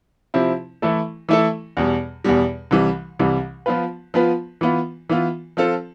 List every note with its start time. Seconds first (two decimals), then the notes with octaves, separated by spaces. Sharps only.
0.34 C3 F3 C4 E4
0.82 E3 A3 E4 A4
1.29 E3 A3 E4 A4
1.77 E2 B2 G3
2.24 E2 B2 G3
2.71 C2 C3 E3 G3
3.19 C2 C3 E3 G3
3.66 F3 B3 F4 B4
4.14 F3 B3 F4 B4
4.61 E3 B3 F4
5.09 E3 B3 F4
5.57 F3 C4 F4 A4